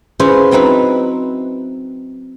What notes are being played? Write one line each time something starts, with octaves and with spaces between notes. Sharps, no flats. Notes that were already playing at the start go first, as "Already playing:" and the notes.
C#4 E4 F4 G#4 B4 C5
F#3 C4 D#4 E4 B4